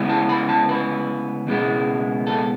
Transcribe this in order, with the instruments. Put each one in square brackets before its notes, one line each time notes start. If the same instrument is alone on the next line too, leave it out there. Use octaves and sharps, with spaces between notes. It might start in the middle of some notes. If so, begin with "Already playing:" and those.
Already playing: [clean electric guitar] C#3 G#3 B3 E4
A5
B5
A5
B4
C#2 B2 G#3 B3 E4
A4